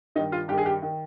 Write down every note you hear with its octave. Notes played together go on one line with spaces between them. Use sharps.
G2 D#3 D#4
F4
G2 D#3 G4
G#4
G4
D#3